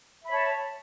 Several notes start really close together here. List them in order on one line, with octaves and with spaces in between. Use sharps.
E5 B5 C#5 A5